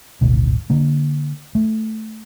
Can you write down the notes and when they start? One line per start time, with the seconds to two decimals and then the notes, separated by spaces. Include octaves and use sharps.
0.21 D1 G#1 G#2 B2
0.70 D3 A#3
1.55 A3